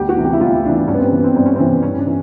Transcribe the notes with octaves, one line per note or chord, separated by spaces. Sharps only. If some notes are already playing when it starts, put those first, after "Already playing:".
Already playing: D2 G4
F#4
C3 E3
G4
E4
D2 F4
E4
C3 E3 D4
D4
G2 C#4
B3
C4
E3 B3
C4
G2 C4
C#4
E3 C4
G2 C#4
D4
E3